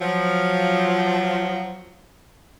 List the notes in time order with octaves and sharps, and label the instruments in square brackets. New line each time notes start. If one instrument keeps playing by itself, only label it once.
[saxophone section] F3 [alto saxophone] F#3